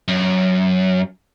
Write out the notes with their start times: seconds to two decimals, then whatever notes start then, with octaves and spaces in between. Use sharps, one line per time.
0.08 F#2